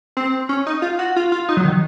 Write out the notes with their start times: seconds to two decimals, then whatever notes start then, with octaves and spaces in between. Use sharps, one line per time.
0.17 C4
0.49 C#4
0.67 D#4
0.82 F4
0.99 F#4
1.16 F4
1.32 F4
1.49 D#4
1.57 F#3
1.65 D#3